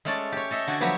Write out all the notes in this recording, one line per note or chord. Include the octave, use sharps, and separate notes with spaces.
G#3 A3 C#4 C#5 D5 A5
G4 C#5
A4 D#5 E5
D3 F#4 D5 G#5
F3 F#3 B3 G4 C#5 E5